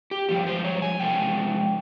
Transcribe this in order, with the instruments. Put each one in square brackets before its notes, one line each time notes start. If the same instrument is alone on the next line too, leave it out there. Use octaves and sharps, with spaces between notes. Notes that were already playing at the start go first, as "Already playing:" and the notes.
[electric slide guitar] G4
G2 F3 G#3 G4
C5
C#5
G#5
C3 F3 G#3 G5